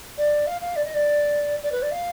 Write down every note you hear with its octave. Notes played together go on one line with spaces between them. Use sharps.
D5
F5
F5
D5
D#5
D5
D5
B4
D5
F5